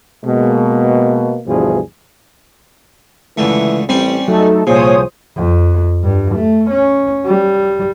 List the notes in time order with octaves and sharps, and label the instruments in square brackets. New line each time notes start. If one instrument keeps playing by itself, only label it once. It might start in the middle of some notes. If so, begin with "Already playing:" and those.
[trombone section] B2 G#3 A#3
D2 G2 B2 E3 F3 G#4
[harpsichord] C#2 D3 A3 [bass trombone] E3
[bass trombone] A1 [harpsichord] G3 C#4 D5 [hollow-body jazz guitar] C4
[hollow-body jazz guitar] F#3 [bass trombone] A3 [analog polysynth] D#4 A4
[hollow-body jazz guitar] C2 G#4 [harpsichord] A#2 [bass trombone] F3 [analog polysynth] C5 C#5 D#6
[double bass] F2
G2
A3
C#4
G3